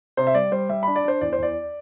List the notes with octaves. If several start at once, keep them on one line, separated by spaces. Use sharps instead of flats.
C3 C5
E5
G3 D5
G3 C5
G3 E5
D4 B5
D5
D4 C5
E2 D5
C5
E2 D5